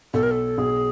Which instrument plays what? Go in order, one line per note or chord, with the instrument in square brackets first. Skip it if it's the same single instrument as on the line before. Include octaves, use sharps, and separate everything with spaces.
[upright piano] B1 [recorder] A4
[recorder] A#4
A4
[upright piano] B1 [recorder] G#4